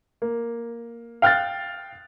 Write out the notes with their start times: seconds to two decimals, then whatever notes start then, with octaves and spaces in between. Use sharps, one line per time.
0.22 A#3
1.22 F5 G5 F6 F#6 A6